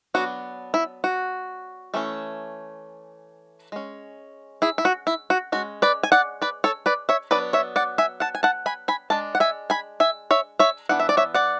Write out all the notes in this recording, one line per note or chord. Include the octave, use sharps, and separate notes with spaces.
F#3 B3 D4 F#4
E4
F#4
E3 A3 C#4
G#3 C#4
E4 G#4
E4
F#4
E4
F#4
G#3 C#4 F#4
B4 D5
G#5
D5 F#5
B4 D5
A4 C#5
B4 D5
C#5 E5
F#3 B3 D4 B4 D5
C#5 E5
D5 F#5
E5 G#5
F#5 A5
G#5
F#5 A5
G#5 B5
G#5 B5
G#3 D4 A5
F#5
E5 G#5
G#5 B5
E5 G#5
C#5 E5
C#5 E5
E3 B3 D4 F#5
E5
D5
C#5 E5
D5 F#5